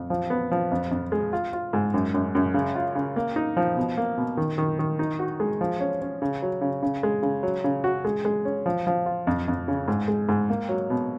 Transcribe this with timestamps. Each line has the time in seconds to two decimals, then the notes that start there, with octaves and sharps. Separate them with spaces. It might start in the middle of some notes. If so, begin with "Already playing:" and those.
Already playing: F2
0.10 F3
0.30 B3
0.51 F3
0.71 F2
0.91 F2
1.12 G#3
1.33 F4
1.53 F4
1.73 G#2
1.94 F#2
2.14 F#2
2.35 F#2
2.54 C#3
2.75 F4
2.95 C#3
3.16 A#3
3.36 D#4
3.57 F3
3.77 B2
3.97 A#3
4.18 B2
4.37 D#3
4.58 D#3
4.79 D#3
4.99 D#4
5.19 F#4
5.40 G#3
5.61 F3
5.80 C#4
6.02 C#4
6.22 C#3
6.42 F#3
6.61 C#3
6.83 C#3
7.03 G#3
7.23 C#3
7.43 F#3
7.64 C#3
7.84 F#4
8.05 G#3
8.25 G#3
8.45 C#4
8.66 F3
8.87 F3
9.06 F4
9.27 F2
9.48 F2
9.68 C#3
9.88 G#2
10.08 G#3
10.29 G#2
10.50 A#3
10.69 F#3
10.90 B2